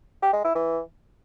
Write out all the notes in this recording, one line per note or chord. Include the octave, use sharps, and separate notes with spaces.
G4
G#3
E4
E3